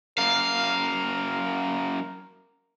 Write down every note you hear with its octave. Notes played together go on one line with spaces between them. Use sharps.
F#2 A#3 A#4 F5